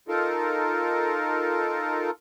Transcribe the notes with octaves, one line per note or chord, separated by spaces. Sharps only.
D#4 F4 A4 A#4